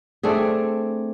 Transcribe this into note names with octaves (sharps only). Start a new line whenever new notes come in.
A3 C4 D4 G#4